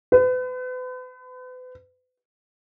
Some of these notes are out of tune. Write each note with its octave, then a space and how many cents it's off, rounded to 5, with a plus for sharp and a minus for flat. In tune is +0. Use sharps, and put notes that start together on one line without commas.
B4 +40